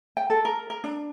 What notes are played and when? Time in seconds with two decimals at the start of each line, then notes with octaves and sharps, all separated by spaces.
0.17 G5
0.30 A4
0.45 A#4
0.70 A#4
0.84 D4